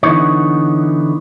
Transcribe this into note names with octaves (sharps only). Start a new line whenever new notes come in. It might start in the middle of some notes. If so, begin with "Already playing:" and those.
D3 E3 B3 D#4 C#5